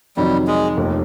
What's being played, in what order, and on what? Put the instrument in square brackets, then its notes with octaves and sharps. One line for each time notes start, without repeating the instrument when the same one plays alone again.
[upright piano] F2 C3 D#3 F#3 [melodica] G3
[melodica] G#3
[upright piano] F1 D#2 D#3